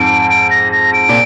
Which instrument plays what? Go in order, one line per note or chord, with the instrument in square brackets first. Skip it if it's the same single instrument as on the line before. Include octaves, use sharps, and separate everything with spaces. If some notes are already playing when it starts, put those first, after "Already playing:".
Already playing: [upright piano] F2 G#2 [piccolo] D7
[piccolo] D7
A#6
A#6
D7
[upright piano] A#2